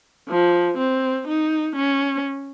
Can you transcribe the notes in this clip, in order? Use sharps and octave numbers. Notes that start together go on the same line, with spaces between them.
F3
C4
D#4
C#4